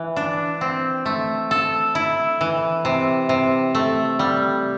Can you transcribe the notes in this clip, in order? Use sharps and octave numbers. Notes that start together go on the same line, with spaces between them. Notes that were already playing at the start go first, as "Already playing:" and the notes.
Already playing: E3
D4
C4
A3
A4
E4
E3
C3
C3
A3
G3